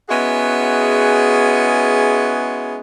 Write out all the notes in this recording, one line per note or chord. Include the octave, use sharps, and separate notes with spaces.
G#3 B3 C#4 E4 F#4 G#4